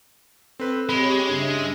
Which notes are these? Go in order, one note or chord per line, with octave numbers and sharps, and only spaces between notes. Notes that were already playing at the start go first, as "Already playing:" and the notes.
C4 A4 B4
G#3 C4 G4 C#5 B5
G2 C#3 D4 E5